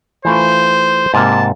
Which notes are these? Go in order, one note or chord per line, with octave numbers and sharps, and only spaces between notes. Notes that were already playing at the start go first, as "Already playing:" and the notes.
E3 A3 F4 C5
G#2 C3 A#3 A5